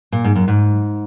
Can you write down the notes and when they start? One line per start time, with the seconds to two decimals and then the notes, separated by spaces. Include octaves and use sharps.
0.12 A#2
0.24 G#2
0.35 F#2
0.48 G#2